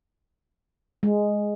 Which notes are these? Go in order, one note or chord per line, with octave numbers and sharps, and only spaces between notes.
G#3